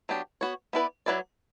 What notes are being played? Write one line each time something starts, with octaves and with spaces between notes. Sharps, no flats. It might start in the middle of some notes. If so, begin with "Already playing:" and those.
F#3 B3 D4 G4
B3 F#4 C#5
B3 E4 B4 D5
F#3 B3 E4 B4 D5